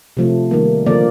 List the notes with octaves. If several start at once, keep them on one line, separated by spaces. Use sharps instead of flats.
C3 F3 A3
D#3 G3 A#3
D3 F3 A#3 D5